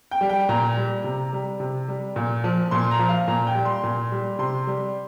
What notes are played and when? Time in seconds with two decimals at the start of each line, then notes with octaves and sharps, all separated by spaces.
0.11 G5
0.21 G3
0.29 G5
0.49 A#2 A#5
0.77 G3
1.04 C3
1.33 G3
1.60 C3
1.88 G3
2.16 A#2
2.44 F3
2.71 A#2 C6
2.91 A#5
2.99 F3
3.08 F5
3.28 A#2 A#5
3.47 G5
3.55 G3
3.65 C6
3.84 A#2
4.12 G3
4.39 C3 C6
4.67 G3